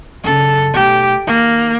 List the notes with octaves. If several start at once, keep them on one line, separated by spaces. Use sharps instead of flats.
F#2 C#3 A4
B1 A3 G4
D#3 A#3